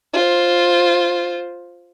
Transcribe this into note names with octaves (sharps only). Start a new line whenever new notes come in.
F4 C5